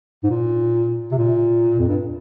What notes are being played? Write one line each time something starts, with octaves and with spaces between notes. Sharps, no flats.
G#2
A#2
C3
A#2
F2
G2